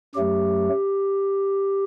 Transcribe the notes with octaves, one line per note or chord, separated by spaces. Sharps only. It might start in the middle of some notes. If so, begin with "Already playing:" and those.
F#2 F#3 A3 G4